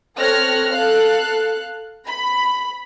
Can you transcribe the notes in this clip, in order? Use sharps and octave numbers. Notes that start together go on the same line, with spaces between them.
C4 A4 C#5 F6 F#6 A#6
A4 F5 F#6
B5